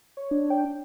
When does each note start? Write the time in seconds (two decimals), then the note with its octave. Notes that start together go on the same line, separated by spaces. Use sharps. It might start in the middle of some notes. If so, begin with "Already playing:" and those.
0.17 C#5
0.31 D4
0.50 G5